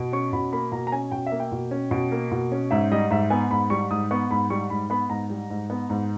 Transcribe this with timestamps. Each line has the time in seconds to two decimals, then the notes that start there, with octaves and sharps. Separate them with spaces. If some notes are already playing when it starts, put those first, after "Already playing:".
Already playing: B2
0.13 C#4 C#6
0.33 B2 B5
0.52 A#3 B5
0.72 B2 A#5
0.87 A#5
0.92 C#4 G#5
1.12 B2 G5
1.26 E5
1.32 A#3
1.40 G5
1.52 B2
1.71 C#4
1.91 B2
2.12 A#3
2.32 B2
2.52 C#4
2.71 G#2 E5
2.92 G3 D#5
3.10 G#2 E5
3.30 B3 G#5
3.51 G#2 B5
3.70 G3 C#6
3.90 G#2 D#6
4.11 B3 C#6
4.31 G#2 B5
4.50 G3 C#6
4.70 G#2 B5
4.90 B3 B5
5.10 G#2 A#5
5.30 G3
5.50 G#2
5.70 B3
5.90 G#2